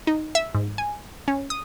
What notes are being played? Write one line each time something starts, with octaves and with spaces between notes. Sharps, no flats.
D#4
E5
G#2
G#5
C#4
D#6